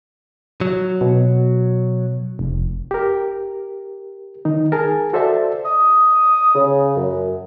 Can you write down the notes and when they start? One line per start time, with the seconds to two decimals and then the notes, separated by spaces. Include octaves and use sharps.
0.61 F#3
1.01 B2
2.39 F1
2.91 G4 A#4
4.45 D#3 D#4
4.72 G#4 A#4 G#5 A5
5.13 F#4 A4 C5 D5 E5 A5
5.65 D#6
6.55 C#3
6.97 F#2